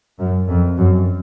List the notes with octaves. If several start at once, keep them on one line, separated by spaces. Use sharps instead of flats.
F#2
F2
F#2